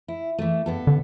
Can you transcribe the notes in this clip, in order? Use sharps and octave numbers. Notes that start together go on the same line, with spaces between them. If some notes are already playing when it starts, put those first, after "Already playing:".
E4
E3 A3
G2 B3 A4
D3